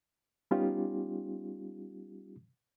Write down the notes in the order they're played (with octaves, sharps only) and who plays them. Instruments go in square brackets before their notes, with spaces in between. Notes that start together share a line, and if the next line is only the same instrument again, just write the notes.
[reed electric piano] G3 B3 C#4 D#4 F4 G4